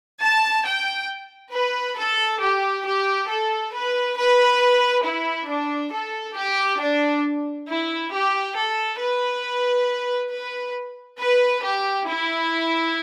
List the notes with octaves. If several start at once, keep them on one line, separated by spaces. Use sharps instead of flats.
A5
G5
B4
A4
G4
G4
A4
B4
B4
E4
D4
A4
G4
D4
E4
G4
A4
B4
B4
B4
G4
E4